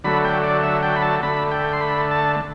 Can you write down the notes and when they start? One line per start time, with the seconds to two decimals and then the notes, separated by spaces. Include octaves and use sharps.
0.04 D3 F#3 A3 B5
0.25 G5
0.43 D5
0.63 E5
0.83 G5
0.96 B5
1.02 A5
1.23 D3 A3 B5
1.51 G5
1.73 C6
1.81 B5
2.11 A5